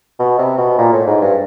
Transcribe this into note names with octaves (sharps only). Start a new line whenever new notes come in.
B2
C3
B2
A#2
A2
G#2
G2